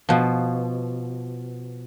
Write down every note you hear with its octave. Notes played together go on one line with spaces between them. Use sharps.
B2 F3